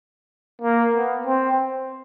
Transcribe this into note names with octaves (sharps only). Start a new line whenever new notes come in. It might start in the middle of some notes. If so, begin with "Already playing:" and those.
A#3
B3
C4